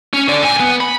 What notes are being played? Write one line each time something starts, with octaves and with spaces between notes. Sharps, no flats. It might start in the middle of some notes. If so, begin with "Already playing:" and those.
C#4
D3 D5
A#2 G#5
B3
B5